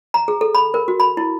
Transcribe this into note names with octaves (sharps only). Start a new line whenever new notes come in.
A#5
G#4
A4
B5
A#4
F#4
B5
E4